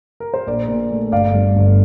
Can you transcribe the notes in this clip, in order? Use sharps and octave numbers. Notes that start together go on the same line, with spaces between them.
A#4
C5
A#1 A#4 D5
A#2
A3
G1 D5 F5
G2
G1